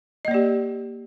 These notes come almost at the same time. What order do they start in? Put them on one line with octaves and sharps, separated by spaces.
D#5 A#3 D5 G4